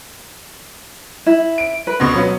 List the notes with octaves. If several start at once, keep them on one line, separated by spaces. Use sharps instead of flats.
E4
D7
B4
D2 B2
F#3 B3